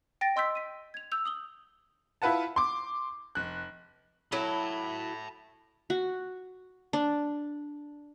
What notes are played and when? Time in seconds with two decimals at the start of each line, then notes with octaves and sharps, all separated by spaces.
0.21 G5 A6 A#6 D7
0.36 D#5 C6 E6 G6 B6
0.55 B6 D#7
0.94 G#6 F7
1.12 E6 G6 F7
1.25 D#6 F#7 G7
2.22 E4 F4 B4 F#5 A5
2.56 C6 D6
3.35 F1 F#6
4.32 F#3 E4 A4 A5 B5
5.90 F#4
6.93 D4